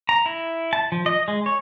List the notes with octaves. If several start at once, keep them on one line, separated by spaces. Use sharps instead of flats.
A#5
E4
A5
F3
D#5
G#3
C#5